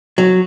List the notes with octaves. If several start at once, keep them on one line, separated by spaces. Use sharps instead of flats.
F#3